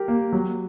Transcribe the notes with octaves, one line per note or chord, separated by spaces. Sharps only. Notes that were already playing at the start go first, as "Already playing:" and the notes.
Already playing: G4 A#4
A#3
F#3